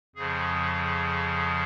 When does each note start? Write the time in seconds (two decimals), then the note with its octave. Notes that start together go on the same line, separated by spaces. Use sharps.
0.16 F2 C#3 F3 G#4